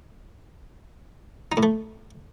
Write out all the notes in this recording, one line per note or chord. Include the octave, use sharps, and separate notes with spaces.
D#4
A2
A3